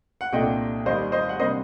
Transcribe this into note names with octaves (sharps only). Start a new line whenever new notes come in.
F#5
C2 A#2 A3 D4 D#5 G5
D#2 D#3 G3 C5 D#5
C5 D#5
F#5
C3 G3 A#3 D4 C5 D#5